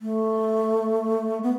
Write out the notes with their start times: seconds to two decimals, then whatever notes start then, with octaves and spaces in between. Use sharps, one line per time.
0.02 A3
1.43 B3